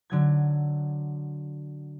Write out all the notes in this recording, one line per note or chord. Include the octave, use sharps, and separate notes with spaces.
D3 F#3 G#6